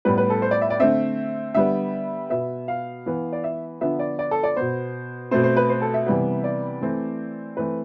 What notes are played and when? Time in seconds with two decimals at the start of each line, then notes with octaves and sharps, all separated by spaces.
0.05 A2 G3 B3 B4
0.18 B4
0.30 A4
0.42 C5
0.51 D5
0.61 E5
0.70 D5
0.80 D3 A3 C4 E5
1.55 D3 G3 B3 E5
2.30 B2 B3 E5
2.68 F5
3.06 E3 B3
3.33 D5
3.44 E5
3.81 D3 F3 B3 E5
3.99 D5
4.19 D5
4.31 A4
4.43 D5
4.56 B2 B3 C5
5.31 B2 A3 C4 C5
5.44 C5
5.57 B4
5.69 C5
5.82 A4
5.94 E5
6.06 C3 E3 G3 B3
6.44 D5
6.81 E3 A3 C4
7.57 E3 A3 C4 B4